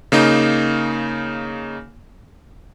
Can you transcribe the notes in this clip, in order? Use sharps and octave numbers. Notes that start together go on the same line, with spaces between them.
C#3 A#3 D#4